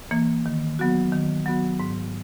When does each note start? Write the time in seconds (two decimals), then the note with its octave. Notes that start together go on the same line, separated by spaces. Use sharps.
0.11 E3 A#3
0.46 D#3
0.79 F#3 B3 F#4
1.12 D#3
1.46 F#3 B3 F#4
1.80 G#2